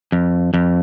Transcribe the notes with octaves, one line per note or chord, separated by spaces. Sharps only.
F2
F2